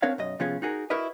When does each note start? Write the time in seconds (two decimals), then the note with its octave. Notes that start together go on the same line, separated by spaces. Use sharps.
0.02 C4 D4 A#4 C#5 F5
0.18 B1 F#2 D#5
0.39 C3 F3 B3 C#4 F4 G#4
0.62 D#4 F#4 G#4 A#4
0.90 E4 F#4 A#4 B4 D#5